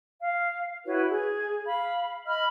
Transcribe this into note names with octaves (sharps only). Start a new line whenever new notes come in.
F5
E4 F#4 B4 C#5
G#4
F5 B5
D#5 B5 F6